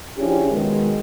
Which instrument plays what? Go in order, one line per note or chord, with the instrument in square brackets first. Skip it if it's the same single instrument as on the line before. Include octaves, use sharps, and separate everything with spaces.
[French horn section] F3 C#4 D4 E4 G4 G#4
B2 D#3 F#3 G#3